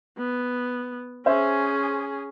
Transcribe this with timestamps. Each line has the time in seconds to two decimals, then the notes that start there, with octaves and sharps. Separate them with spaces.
0.18 B3
1.26 C#4 G#4 C5 E5